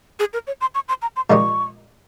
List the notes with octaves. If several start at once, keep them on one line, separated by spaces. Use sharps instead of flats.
G#4
A#4
C#5
C6
C#6
C6
A#5
C6
A#2 F3 G#3 D#4 G4 C#6